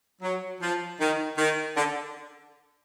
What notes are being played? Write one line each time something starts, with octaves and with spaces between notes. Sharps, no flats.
F#3
F3
D#3
D#3
D3